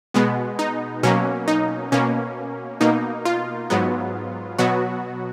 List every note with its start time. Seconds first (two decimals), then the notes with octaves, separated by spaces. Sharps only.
0.14 B2 G#3 B3
0.59 D#4
1.03 B2 F#3 A#3 C#4
1.48 D#4
1.92 B2 A#3 C#4
2.81 B2 A#3 D#4
3.25 F4
3.70 G#2 F#3 B3
4.58 B2 F#3 B3 F#4